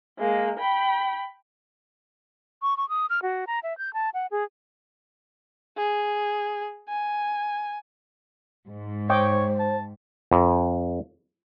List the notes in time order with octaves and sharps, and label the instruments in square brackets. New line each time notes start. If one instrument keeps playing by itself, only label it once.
[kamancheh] G#3 A#3
G5 B5
[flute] C#6
C#6
D#6
F6
F#4
A#5
E5
G6
A5
F#5
G#4
[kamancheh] G#4
G#5
[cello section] G#2
[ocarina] C5 [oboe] C#5 [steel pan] D#5 G5 D6
[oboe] A5
[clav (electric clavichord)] F2